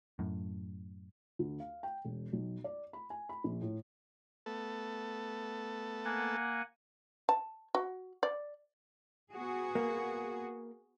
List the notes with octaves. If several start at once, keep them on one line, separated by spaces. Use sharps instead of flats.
F#2 A2
D2
F5
G5
E1
B1
D5
B5
G#5
B5
A#1
A2
A3 B3 A4
A#3 F#5 G#5
A5
F#4
D5
B3 F#4 G#4
A#3